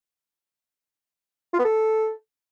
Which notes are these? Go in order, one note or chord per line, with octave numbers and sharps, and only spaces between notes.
F4
B3
A4